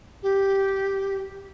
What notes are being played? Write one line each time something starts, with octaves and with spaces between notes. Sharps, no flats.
G4